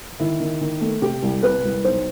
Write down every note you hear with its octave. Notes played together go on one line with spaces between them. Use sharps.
D#3 E4
D#3
D#3
A3
C3 G4
C2
C3 B4
C2
B1 C5